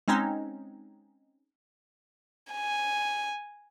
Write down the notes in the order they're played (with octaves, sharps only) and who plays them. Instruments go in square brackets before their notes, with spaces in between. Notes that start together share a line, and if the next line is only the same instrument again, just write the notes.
[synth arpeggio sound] G#3 C4 C#4 D#4
[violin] G#5